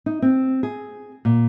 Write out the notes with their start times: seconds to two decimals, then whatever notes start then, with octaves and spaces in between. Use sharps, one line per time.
0.06 D#4
0.22 C4
0.63 G#4
1.25 A#2